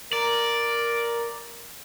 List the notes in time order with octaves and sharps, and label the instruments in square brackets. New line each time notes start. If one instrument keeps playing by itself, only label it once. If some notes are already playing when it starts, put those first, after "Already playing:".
[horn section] A#4 [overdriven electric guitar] D5